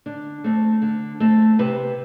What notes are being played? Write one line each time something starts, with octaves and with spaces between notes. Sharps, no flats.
D3 D4
A3 C4
D3
A3 C4
C3 B4